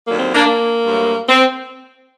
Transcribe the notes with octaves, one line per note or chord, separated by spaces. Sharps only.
D#2 D3 F#3 A#3
C4
A#3 D4
A#3
G2 F#3 A3
C4